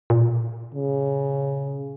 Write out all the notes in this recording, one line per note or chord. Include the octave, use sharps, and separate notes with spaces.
A#2
C#3